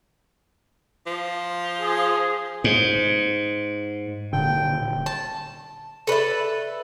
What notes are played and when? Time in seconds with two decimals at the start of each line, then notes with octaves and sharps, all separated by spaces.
1.07 F3
1.81 G#4
2.64 G#2
4.33 D#1 A#2 D3 G5
5.06 A5
6.07 A4 B4 D5 E5